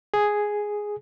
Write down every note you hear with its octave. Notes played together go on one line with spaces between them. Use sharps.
G#4